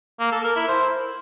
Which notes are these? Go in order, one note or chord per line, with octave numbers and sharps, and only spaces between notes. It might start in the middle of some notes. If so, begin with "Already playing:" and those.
A#3
A4
A#4
E4
C5